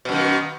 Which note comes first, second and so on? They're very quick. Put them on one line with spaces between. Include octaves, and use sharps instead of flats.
B2 F#2 D#3